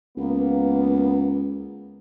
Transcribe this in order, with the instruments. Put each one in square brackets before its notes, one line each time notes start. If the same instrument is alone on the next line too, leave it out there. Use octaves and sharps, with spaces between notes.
[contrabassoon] C#2 [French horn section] A#3 B3